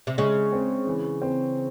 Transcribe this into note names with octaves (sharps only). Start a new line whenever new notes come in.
C3
C#3 G#3
C4
E3
C4